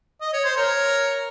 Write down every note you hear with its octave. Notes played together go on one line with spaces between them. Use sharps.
D#5
C#5
C5
A#4 C#5